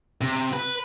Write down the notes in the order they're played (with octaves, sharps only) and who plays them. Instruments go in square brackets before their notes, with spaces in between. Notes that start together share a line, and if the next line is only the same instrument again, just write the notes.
[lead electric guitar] C3
B4